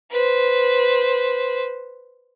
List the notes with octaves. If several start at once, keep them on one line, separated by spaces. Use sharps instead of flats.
B4 C5